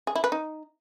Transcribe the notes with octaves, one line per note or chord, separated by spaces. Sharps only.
G#4
E4
B4
D#4